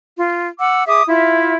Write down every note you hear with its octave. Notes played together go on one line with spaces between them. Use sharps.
F4
F#5 D6 E6
G#4 E5 D6 D#6
E4 F4 E5